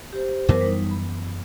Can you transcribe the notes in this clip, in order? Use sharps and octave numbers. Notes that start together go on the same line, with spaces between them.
G4 C5
F#2 E3 B3 A#4 C5 D6
G3 D#4
B5